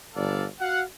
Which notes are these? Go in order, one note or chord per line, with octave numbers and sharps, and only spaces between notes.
G1 D4 A4 D5 F5
F#4 F5 F#5